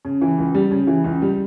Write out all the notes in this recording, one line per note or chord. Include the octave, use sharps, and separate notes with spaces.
C#3
E3
C#2
G3
C#3
E3
C#2
G3